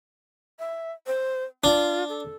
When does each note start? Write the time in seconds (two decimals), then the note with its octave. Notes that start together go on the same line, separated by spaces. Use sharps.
0.59 E5
1.07 C5
1.64 D4 F4
2.09 A4